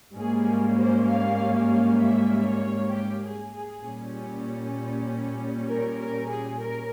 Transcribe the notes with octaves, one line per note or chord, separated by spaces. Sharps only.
G#2 G3 A#3 C#4 G#4
C5
F5
F5
E5
C#5
G4
G#4
G#4
A#2 G3 C#4
A#4
A#4
G#4
A#4